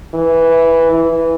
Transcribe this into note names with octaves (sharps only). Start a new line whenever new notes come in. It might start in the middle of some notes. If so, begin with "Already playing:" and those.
E3
E3